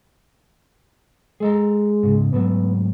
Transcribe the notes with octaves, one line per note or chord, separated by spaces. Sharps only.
G#3 G#4 A4 A#5
G#2 C#3
G#2 F#3 A3 B3